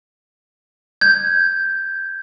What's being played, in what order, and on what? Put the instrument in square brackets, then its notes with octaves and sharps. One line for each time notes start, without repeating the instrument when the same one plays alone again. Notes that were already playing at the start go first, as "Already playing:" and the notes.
[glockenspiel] G6 G#6